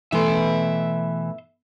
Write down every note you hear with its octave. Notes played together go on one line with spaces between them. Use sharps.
B2 E3 A3 E5 C6